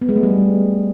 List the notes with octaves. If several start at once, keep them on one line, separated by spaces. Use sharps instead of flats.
B3
G#3
A3
G3